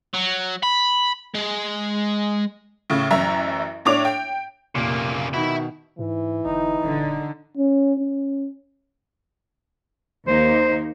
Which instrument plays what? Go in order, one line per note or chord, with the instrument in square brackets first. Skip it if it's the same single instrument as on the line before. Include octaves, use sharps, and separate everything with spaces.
[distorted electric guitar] F#3
B5
G#3
[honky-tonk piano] A2 C#3
A1 F#2 E5 A#5
A2 D4 C#5 D6 F7
G5
[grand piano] F1 A#2 [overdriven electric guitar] C#3 A#3
[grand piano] B2 D#3 [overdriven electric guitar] E5 B5
[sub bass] G#2 [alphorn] E3
[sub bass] G1 [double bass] D#4
[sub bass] D#1 [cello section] D3
[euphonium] C#4
C#4
[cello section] D#2 A#3 D#4 [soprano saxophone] C5